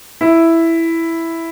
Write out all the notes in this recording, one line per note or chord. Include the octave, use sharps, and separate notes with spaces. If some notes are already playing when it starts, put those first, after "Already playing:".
E4